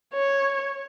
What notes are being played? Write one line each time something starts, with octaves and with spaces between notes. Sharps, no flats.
C#5